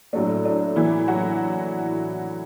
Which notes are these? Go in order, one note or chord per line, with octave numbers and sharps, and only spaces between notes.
A2 F#3 A3 D4
D4
E3 E4
F#3 F#4